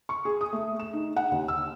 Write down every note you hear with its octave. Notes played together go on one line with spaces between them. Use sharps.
C#6
G#4
D#6
A3
E7
D#4
F#5
D#2
E6